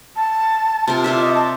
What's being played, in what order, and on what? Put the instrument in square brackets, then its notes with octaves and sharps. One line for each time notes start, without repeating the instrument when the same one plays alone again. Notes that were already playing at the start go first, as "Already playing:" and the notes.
[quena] A5
[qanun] C3 F4 A#4
F4 D5 E5
[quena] D#5
A5